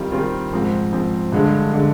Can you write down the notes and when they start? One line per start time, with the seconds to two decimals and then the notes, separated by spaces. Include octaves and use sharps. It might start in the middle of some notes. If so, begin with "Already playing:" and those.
Already playing: D#3 G3 C4 F4
0.12 D#3 G3 C4 F4
0.53 G#2 F3 C4
0.92 G#2 F3 C4
1.32 G2 D3 G#3
1.73 D3 G#3